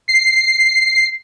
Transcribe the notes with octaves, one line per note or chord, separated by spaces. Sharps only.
C7